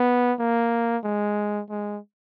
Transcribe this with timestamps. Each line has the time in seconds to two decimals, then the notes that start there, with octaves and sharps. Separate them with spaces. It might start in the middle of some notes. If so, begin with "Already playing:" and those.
Already playing: B3
0.39 A#3
1.04 G#3
1.70 G#3